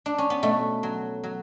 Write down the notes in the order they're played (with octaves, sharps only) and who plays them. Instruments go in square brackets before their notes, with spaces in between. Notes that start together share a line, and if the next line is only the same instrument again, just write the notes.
[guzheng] D4
C#4
B3
B2 A3
F#3
F#3